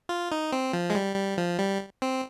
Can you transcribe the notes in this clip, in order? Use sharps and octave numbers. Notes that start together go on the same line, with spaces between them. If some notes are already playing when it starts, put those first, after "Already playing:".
F4
D#4
C4
F3
G#3
G3
G3
F3
G3
C4